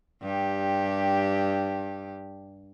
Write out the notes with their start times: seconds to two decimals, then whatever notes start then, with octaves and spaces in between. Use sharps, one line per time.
0.22 G2 G4